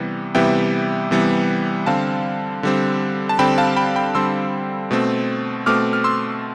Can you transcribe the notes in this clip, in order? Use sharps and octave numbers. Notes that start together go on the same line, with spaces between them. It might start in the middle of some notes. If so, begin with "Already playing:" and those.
Already playing: C3 E3 G3 B3
C3 E3 G3 B3 E5 G5
C3 E3 G3 B3
D3 G3 C4 F5 A5
D3 G3 C4
A5
D3 G3 C4 G5 B5
F5 A5
G5 B5
G5 B5
D3 G3 C4 C6 E6
B2 A3 C4
B2 A3 C4 D6 F6
F6
C6 E6